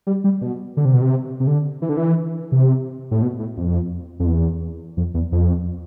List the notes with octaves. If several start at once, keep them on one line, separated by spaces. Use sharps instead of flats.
G3
G3
B2
D3
C3
B2
C3
C3
D3
E3
D3
E3
C3
A2
B2
A2
F2
F2
E2
F2
E2
F2